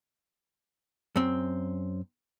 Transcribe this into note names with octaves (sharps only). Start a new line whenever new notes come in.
F#2 C4